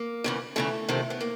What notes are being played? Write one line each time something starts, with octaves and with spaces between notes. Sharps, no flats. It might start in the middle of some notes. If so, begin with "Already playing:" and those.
Already playing: A#3
E2 C#3 E3
E2 C#3 E3 A3
F2 C3 D#3
B3
A#3